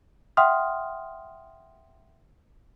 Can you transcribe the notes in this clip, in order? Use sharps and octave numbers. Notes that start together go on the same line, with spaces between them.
E5 F#5 G5 C6 D#6 F6